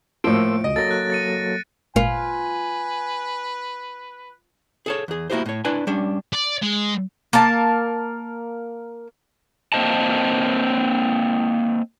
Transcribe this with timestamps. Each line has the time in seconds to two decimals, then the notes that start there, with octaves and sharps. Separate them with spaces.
0.24 A2 F3 A#3 C6 E6 D7
0.64 C#2 D#5
0.76 F#3 A#3 A4 A6 A#6
0.91 F#6
1.10 A6 C#7 D#7
1.96 G#1 A#2 F4 B4 G#5
4.86 G#4 A4 C#5
5.08 E2 G#4
5.30 A#3 E4 F#4 G4 C5
5.46 A2 C#5
5.65 D4 E4 B4 D5 G#5
5.87 G3 C#4 D4
6.33 D5
6.62 G#3
7.33 A#3 A#4 A5
9.73 A#3 C4 C5 D#5 A5